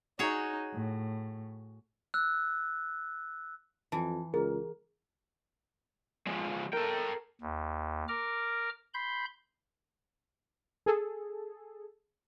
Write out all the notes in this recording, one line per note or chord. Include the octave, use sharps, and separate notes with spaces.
D#4 F#4 G#4 C#5
A2
E6 F#6
F2 E3 A5
C#2 G#4 A#4
F3 G#3
A4 A#4 G5
D#2
A#4 A#5 D6 F6
B5 C6 G6
G#4 A4